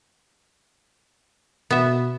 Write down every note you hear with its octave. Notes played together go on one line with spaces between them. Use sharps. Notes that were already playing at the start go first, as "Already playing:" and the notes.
B2 B3 E5